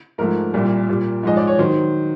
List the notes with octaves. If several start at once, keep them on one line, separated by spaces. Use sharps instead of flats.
G#2 F3 A3 A#4
C2 A#2 G3
A#2 G3
G#2 F3 G#3 D#5
D5
C#5
D#3 F#3 C5